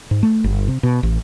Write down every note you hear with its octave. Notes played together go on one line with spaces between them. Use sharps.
G#2
A3
G1
C3
B2
A1